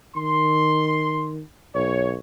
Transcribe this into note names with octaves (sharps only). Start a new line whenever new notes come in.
D#3 C6
B1 C#5